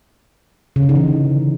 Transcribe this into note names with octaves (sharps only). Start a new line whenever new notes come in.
C#3
D3
D#4
E3